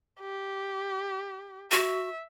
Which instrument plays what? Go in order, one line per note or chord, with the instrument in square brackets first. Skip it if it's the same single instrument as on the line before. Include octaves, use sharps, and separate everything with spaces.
[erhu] G4
[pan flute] F#4 [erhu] E5